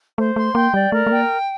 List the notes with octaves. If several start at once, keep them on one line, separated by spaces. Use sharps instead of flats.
A3 C5
A3 C6
A#3 G5
G3 D5
A3 A#4
A3
A#3 G5